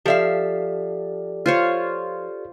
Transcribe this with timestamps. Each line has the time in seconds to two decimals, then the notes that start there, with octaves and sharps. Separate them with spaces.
0.06 F3 G4 A4 D5 E5 F5
1.46 F4 C5 C#5